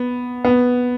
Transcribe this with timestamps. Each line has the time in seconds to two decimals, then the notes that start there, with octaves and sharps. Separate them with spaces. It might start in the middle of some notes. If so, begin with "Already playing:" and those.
Already playing: B3
0.45 B3